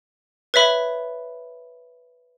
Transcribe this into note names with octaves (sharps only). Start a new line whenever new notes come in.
B4 C#5 E5 B5